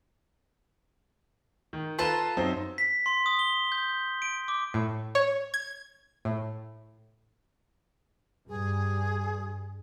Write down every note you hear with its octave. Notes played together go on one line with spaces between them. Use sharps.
D#3
F4 A4 B4 A5 A#5
F#2 C4 D#4
B6
C6
D#6
G7
G6
D7
D6
A2
C#5
G#6
A2
G2 G#4